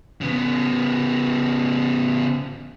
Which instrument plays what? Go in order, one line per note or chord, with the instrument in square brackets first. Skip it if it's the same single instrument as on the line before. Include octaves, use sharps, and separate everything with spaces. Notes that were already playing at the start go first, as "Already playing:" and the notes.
[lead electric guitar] C#3 B3